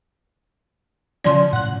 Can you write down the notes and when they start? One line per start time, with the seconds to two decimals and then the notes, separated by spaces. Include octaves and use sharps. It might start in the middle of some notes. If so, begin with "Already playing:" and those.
1.24 C#3 F3 C#4 D5 C6
1.53 A2 F#5 F#6